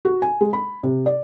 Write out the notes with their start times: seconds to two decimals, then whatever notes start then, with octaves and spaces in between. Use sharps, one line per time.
0.05 F#4
0.22 G#5
0.41 G#3
0.53 B5
0.83 C3
1.06 D5